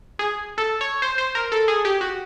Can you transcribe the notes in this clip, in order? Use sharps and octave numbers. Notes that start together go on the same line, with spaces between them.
G#4
A4
C#5
C5
C5
A#4
A4
G#4
G4
F#4